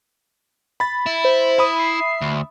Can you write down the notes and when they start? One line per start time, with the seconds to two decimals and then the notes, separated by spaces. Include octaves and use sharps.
0.80 B5 A6
1.06 E4
1.24 C5
1.58 E5 B5 D#6
1.79 C7
2.21 D2